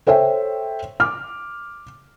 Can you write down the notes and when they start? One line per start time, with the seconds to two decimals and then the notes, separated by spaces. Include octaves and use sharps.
0.07 A4 C5 C#5 E5 G5
1.00 D6 F6